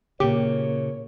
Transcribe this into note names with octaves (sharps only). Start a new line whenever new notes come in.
A#2 C#3 A#3 G4 C#5